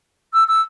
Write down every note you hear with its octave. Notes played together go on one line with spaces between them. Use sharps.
E6
E6